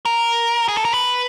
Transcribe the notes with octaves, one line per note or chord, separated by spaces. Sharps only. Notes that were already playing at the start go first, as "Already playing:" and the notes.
A#4
G#4
A4
A#4
B4